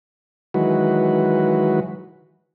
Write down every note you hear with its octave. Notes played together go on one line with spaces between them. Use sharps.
D#3 E3 F#3 G#3 F#4 B4